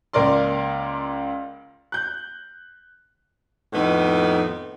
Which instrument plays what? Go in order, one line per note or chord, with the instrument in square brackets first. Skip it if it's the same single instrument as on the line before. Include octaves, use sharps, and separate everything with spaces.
[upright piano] C#2 A#3 A#4 D5 C6
F#6 G6
[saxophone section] F2 A2 D#3 B3 D#4